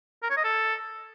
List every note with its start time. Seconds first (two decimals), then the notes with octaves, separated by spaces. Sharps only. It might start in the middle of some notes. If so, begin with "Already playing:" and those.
0.23 A#4
0.30 C#5
0.37 D#5
0.44 A4